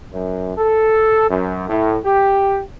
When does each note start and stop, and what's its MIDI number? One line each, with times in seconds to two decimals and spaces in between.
0.12 0.52 42
0.57 1.26 69
1.29 1.68 42
1.68 1.97 45
2.05 2.61 67